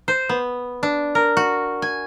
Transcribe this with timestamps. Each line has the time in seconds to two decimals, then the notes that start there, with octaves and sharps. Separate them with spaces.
0.08 C5
0.29 B3
0.83 D4
1.15 A#4
1.37 F#4
1.82 G#5